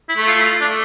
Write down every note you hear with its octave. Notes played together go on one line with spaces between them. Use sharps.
E4
A3
F4
E4
F4
D4
A3